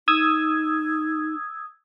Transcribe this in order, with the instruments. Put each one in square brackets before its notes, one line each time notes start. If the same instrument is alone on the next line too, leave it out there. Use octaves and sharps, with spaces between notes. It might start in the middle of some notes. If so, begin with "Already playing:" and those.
[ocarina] D#4 [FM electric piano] D#6 E6 G#6